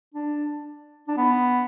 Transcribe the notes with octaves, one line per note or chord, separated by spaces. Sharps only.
D4
D4
B3